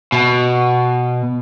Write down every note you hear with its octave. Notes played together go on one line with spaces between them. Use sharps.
B2